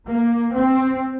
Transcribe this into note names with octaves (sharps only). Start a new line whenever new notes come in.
A#3
C4